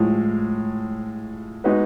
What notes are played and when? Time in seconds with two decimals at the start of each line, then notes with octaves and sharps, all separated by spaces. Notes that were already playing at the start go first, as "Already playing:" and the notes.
Already playing: A2 F3 G#3
1.64 G#3 B3 D#4 F#4 B4